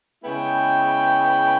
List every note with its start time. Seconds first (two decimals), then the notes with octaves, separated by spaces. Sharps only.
0.24 C#3 G#3 B3 E4 G5